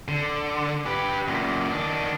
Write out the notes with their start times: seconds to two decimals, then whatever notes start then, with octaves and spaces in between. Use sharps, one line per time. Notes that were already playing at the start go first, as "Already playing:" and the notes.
0.08 D3
0.86 G4 B4
1.28 F#2 A#2
1.71 D#3 D4